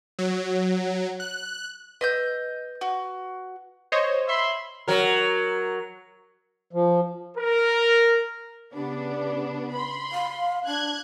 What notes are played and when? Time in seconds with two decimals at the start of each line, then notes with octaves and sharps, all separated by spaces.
0.19 F#3
1.20 F#6
2.01 B4 D#5 E6 G6
2.81 F#4
3.92 C5 C#5 D#5
4.28 E5 B5 C6
4.88 F#3 A#4
6.73 F3
7.38 A#4
8.74 C#3 B3 D4 G4
9.74 B5 C6
10.12 F5
10.66 D4 F#6 G#6